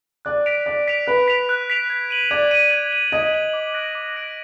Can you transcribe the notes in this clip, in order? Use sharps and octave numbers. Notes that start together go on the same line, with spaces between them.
D5 F#6
B6 D7 F7
D5 F#6
B6 D7 F7
B4 F#6
B6 D7 F7
F#6
B6 D7 F7
G#6
D#7 F#7
D5 G#6
D#7 F#7
G#6
D#7 F#7
D#5 G#6
D#7 F#7
D6
F#6 A#6 D7
D6
F#6 A#6 D7